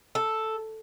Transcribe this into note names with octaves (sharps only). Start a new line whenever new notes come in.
A4